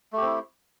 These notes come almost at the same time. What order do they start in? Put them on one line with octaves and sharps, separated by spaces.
A3 G4 C4 E4